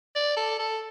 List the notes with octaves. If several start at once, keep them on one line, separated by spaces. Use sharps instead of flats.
D5
A4
A4